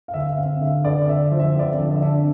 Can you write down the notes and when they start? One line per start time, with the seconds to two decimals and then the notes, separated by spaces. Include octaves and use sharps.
0.08 F5
0.14 D3 E5
0.29 E5
0.37 C4 F5
0.61 D3 E5
0.85 D3 D5
1.02 D5
1.08 D3 E5
1.32 F3
1.39 E5
1.55 C4 D5
1.72 E5
1.78 D3
1.91 D5
2.02 D4 E5